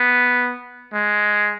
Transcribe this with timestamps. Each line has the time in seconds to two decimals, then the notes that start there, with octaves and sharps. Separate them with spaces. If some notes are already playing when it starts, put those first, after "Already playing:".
Already playing: B3
0.93 G#3